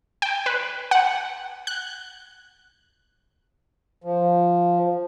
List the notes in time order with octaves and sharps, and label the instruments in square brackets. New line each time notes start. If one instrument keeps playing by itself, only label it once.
[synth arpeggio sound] G5
B4
F#5
F#6
[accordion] F3